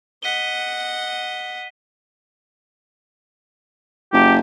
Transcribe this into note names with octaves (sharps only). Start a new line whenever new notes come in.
D#5 F#5 B6 D#7 G7
F#1 G4